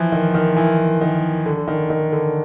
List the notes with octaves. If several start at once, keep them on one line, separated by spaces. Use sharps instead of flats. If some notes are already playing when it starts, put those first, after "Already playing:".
Already playing: E3 F3
D#3
D#3
E3
D#3
D3
D3
D#3
D#3
D3